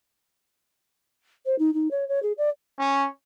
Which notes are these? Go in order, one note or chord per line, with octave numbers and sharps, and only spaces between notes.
C5
D#4
D#4
C#5
C#5
G#4
D5
C#4